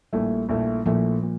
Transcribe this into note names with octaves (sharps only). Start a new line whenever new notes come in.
A#1 A#2 G3 A3 E4
A#1 A#2 A3 E4
A#1 A#2 F3 A3 E4
A#2